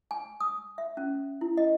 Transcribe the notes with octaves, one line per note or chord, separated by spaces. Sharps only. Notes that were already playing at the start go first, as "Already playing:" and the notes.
G#5
D#6
E5
C#4
E4
D#5